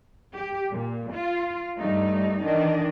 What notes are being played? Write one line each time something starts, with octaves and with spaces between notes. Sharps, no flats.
G4
A#2
F4
G2 G3 A3 D#4
D#3 E3 D4 D#5